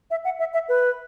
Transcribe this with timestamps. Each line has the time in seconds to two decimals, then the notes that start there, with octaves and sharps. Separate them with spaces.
0.11 E5
0.25 F#5
0.39 E5
0.54 E5
0.69 B4